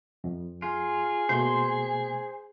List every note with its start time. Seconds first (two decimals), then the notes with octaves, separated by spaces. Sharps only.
0.24 F2
0.62 F4 G#4
1.29 B2 A3 A#3 C5 C6